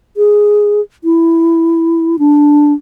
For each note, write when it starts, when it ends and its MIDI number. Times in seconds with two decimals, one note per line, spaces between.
0.17 0.81 68
1.04 2.16 64
2.19 2.73 62